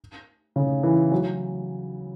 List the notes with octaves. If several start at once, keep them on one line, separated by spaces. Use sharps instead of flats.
C#3
E3
F#3